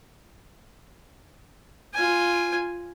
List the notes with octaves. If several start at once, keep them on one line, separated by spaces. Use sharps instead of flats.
F4 G#5